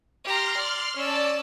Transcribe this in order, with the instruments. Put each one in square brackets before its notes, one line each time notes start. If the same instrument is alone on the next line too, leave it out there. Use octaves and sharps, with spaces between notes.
[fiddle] G4 A#5 [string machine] C6 F6
[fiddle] D5
[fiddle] C#4 E6 [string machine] D5 A5